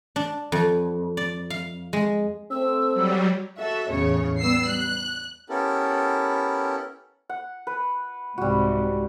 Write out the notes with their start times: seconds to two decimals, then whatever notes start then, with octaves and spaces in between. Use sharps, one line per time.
0.16 D4
0.52 F2
1.17 D5
1.50 F5
1.93 G#3
2.51 A3 C4 E6
2.94 F#3 G3
3.58 F#4 A4 E5
3.90 E2 A2 C#3 C#5
4.41 G3 B3 E6 C7
4.70 F#6
5.49 B3 C#4 E4 G4 A4 A#4
7.29 F#5
7.67 B4
8.38 C2 G#2 C3 G3 F#4